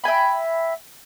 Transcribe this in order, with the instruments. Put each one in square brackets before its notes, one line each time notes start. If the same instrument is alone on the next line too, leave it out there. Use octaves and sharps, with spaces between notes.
[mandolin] E5 G5 G#5 B5